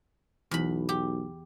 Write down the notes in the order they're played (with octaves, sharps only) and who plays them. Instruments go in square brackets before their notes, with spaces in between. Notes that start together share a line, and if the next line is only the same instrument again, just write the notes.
[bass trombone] B1 [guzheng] E2 B5
[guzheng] G4